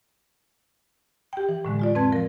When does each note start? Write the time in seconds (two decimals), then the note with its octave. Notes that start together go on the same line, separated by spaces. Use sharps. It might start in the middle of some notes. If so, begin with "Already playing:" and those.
1.33 G4 G5
1.49 E3
1.65 A2 D3 G#3
1.79 G#3 F4 D5
1.95 F2 C4 B4 A5 G#6
2.12 F3 A#4